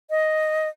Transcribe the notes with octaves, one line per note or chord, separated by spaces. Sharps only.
D#5